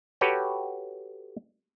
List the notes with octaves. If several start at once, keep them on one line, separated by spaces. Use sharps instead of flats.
F#4 G4 A4 B4 C#5 G5